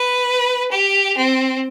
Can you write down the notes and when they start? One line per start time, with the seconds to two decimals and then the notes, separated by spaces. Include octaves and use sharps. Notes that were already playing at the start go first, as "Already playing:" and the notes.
Already playing: B4
0.72 G4
1.17 C4